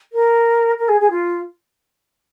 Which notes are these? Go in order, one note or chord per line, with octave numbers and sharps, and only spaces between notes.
A#4
A#4
G#4
G#4
F4